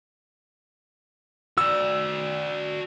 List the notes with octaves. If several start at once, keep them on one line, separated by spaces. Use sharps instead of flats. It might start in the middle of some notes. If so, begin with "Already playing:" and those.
F#4 D5 E6